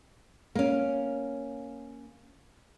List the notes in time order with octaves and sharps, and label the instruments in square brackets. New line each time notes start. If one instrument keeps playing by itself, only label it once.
[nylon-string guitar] A#3 C#4